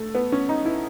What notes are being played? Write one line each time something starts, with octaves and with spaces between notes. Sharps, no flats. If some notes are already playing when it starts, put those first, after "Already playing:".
Already playing: A3
B3
C#4
D#4
E4